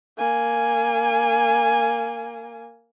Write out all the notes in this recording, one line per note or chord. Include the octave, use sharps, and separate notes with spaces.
A#3 G#5